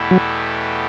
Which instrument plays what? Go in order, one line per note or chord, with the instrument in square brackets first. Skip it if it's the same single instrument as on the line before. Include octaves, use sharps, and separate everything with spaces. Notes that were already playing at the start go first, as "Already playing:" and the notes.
Already playing: [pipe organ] E2 B2 A3 E4 G4
[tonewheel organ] F#3